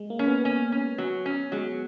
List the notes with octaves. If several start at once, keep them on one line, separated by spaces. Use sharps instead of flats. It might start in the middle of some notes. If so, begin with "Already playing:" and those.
Already playing: G#3
A#3
C#4
B3
C#4
C#4
F#3
C#4
F#3 G#3